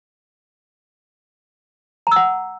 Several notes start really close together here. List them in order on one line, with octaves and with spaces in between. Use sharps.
A#5 E6 F#5